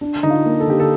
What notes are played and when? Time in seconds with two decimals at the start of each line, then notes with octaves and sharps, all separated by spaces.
0.01 D4
0.23 D3 D#4
0.30 F4
0.45 A#3
0.60 A4
0.67 D3 G4
0.80 A4